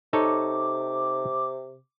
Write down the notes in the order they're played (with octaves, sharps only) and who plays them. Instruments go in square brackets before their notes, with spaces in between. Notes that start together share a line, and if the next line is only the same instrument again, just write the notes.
[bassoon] C3 [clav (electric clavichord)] D#4 A4 C#5 [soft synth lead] D6